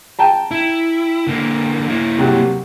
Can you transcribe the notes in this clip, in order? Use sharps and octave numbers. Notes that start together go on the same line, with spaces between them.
G5 A5 A#5
E4
D3 A#3
A#3 E4
C3 F#3 G3